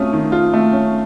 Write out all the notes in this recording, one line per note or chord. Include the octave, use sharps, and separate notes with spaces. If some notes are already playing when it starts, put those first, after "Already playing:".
Already playing: A3 C#4 F4 D#6
D#3
F4
A3
C#4